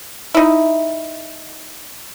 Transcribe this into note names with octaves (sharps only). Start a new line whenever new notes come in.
D#4 E4